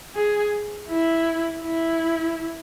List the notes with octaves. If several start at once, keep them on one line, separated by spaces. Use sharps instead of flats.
G#4
E4
E4